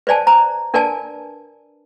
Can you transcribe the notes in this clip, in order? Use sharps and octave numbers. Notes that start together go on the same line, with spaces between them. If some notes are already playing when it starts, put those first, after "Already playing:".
B4 C5 D5 G#5 A5
C5 A#5
D4 A#4 B4 D5 G#5 A5